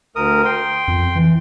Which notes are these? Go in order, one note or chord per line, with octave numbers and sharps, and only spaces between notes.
D2 A#4 D#6
G5 C6
F2
E3